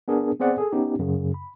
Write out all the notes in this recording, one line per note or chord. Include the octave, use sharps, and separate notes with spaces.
B3 D4 G#4 A#4
B3 C4 G#4 C5 D5 F#5
G#4 A4
B3 C#4 D#4 G4
F#2 C#3
B5